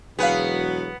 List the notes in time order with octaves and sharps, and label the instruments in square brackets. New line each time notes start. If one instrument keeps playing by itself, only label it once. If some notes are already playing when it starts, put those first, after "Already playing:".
[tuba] E1 [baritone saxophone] F#3 [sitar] B3 B4 [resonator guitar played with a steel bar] G#4 F5